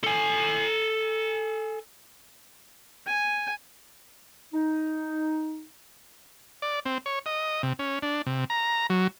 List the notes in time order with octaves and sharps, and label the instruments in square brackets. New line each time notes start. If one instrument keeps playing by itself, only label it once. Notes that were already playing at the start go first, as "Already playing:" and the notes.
[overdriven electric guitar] A4 G#5
[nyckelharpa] G#5
[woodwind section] D#4
[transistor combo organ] D5
C4
C#5
D#5
C3
C#4
D4
C3
A#5
F#3